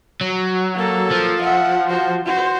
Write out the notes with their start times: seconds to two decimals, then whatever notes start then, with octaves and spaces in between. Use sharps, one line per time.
0.21 F#3
0.75 A#3 A4
1.11 F3
1.41 E5 F#5
1.87 F#4 C5
2.25 F#4 C5